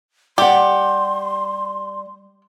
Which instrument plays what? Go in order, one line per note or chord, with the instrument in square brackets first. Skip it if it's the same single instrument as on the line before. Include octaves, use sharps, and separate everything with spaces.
[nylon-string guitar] G3 F#5 [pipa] G4 [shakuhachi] C6